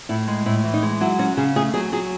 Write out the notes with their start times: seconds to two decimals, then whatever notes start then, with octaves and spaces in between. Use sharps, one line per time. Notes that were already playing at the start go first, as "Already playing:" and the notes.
0.09 A2 E4
0.28 G#3
0.46 A2 E4
0.64 E3
0.74 D#4
0.83 G#3
1.01 F#3 E4
1.19 C#4 F#4
1.37 C#3 G#4
1.56 A3 G#4
1.74 F#3 G#4
1.92 F#3 G#4